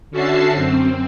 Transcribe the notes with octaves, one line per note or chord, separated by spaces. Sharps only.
D3 C#4 F#4 E5 A5 C7
F#2 C4